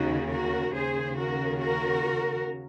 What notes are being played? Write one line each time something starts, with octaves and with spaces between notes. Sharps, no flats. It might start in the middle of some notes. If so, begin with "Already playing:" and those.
Already playing: D#2 C#3 D#4 F#4
F#4 A#4
D#2 C#3 G#4 C5
F#4 A#4
F#4 A#4